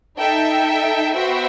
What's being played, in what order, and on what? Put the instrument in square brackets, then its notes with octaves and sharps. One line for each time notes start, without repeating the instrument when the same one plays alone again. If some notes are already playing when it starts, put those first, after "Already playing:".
[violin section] D#4 A4 E5 G5
B3 F#4 C5 E5 G5